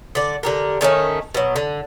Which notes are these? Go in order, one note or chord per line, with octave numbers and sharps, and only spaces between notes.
D3 D5
D3 G4 A#4
D3 D#3 A3 C#4
B2 F#3
D3